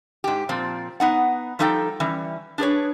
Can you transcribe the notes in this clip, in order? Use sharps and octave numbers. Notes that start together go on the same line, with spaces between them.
G#2 G4
A#2 F3 C4
B3 D#4 F#5
F3 G3 D#4 A4 E5 G5
E3 G3 C#4
D4 G#4 B4 C#5